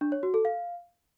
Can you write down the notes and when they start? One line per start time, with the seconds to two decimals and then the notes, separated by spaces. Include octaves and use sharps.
0.01 D4
0.12 C#5
0.23 F#4
0.34 A4
0.45 F5